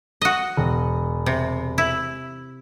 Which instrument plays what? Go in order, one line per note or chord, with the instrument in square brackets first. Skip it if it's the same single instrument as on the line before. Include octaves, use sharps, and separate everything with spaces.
[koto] F#4 D#5
[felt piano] E1
[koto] C3
E4